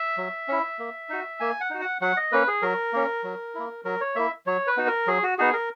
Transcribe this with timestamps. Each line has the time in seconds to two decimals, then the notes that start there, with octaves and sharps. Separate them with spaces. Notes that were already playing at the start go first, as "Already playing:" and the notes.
Already playing: E5
0.18 F#3
0.48 C#4 E4
0.79 A#3
1.09 D#4 F#4
1.40 A#3 G#5
1.60 F#5
1.70 D#4 F#4
1.81 F#5
2.01 F#3 F#5
2.17 D#5
2.32 A#3 C#4 B4
2.48 G#4
2.62 F#3 A#4
2.93 A#3 C#4
3.24 F#3
3.55 A#3 E4
3.85 F#3 A#4
4.01 C#5
4.15 A#3 E4 E5
4.46 F#3 C#5
4.67 B4
4.77 B3 D#4 F#4
4.87 A#4
5.07 F#3 G#4
5.23 F#4
5.38 B3 D#4 F#4 G#4
5.53 A#4